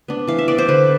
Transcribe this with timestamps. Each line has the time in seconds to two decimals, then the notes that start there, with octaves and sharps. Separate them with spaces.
0.08 B3 D4
0.27 E3 F5
0.39 E5
0.48 B3 D4 D5
0.58 C5
0.68 D3 B4